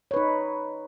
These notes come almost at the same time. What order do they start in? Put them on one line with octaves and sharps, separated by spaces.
C#5 B4 D#4